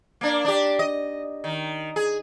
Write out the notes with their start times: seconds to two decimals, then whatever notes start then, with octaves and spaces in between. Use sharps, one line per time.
0.21 A#3 D4
0.45 D4 G4
0.79 D#5
1.44 D#3
1.96 G#4